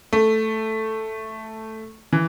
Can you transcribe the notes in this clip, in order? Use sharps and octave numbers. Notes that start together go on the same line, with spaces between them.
A3
E3